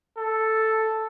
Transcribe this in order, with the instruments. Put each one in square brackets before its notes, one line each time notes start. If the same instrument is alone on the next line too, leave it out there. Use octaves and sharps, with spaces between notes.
[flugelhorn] A4